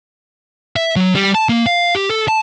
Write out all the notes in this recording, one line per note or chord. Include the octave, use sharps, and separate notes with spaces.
E5
F#3
G3
A5
A#3
F5
G4
A4
A5